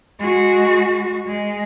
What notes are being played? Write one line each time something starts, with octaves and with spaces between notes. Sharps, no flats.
G#3 F#4
G#3